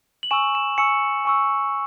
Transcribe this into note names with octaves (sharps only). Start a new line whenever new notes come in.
F#7
G#5 C#6 E6 E7
E7
G#5 C#6 E6 C#7
G#5 C#6 E6